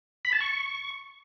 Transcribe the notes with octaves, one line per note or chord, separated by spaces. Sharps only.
B5
A5
C#6